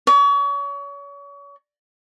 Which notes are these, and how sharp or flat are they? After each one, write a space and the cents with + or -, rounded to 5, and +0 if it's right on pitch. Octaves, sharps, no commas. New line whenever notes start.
C#5 +35